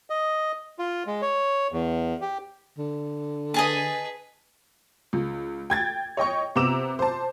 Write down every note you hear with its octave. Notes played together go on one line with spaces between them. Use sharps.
D#5
F4
G#3
C#5
E2
G4
D3
G#4 B4 D#5 G#5 A5
C#2
G5 G#6 A6
C#5 D#5 G5 C#6
C3 B3 A#5 D6 E6 E7
C5 A5